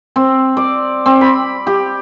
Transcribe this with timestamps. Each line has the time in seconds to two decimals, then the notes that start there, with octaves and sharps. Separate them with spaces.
0.16 C4
0.57 D5
1.06 C4
1.21 B5
1.67 G4